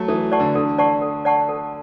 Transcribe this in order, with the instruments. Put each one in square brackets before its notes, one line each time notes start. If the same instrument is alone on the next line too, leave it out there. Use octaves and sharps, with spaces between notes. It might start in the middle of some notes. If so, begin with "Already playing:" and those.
Already playing: [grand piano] F#3 A3
[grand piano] E3 [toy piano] A4
[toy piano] D5 F#5 A5 C#6
[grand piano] D3
[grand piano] D3 [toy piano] A4
[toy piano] D5 F#5 A5 C#6
A4
D5 F#5 A5 C#6
A4